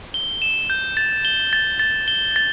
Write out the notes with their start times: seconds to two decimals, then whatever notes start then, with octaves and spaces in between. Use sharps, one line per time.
0.14 G7
0.42 E7
0.70 G6
0.97 A6
1.25 G7
1.53 A6
1.80 A6
2.08 G7
2.36 A6